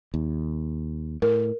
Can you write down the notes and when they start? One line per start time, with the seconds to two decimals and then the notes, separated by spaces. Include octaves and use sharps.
0.14 D#2
1.22 A2 A#4